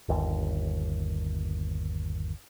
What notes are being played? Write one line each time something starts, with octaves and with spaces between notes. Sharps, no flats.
G1 D#2